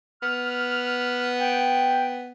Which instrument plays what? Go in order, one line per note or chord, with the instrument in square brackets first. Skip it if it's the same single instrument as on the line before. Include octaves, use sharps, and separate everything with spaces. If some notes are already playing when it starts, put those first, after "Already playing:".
[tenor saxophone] B3 [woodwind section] F6
[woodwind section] G5